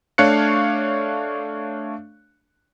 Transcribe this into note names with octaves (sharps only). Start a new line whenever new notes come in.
A3 D4 C#5 F5 F#6 C#7